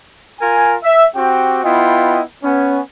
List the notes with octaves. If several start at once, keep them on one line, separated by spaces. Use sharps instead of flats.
F4 A#4 G#5
E5
C4 F#4 G4 G5
B3 E4 F4 D#5 G5
B3 C#4